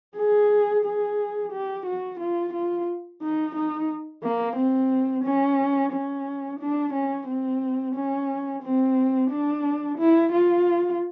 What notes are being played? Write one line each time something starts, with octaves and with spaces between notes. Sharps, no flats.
G#4
G#4
G4
F#4
F4
F4
D#4
D#4
A#3
C4
C#4
C#4
D4
C#4
C4
C#4
C4
D4
E4
F4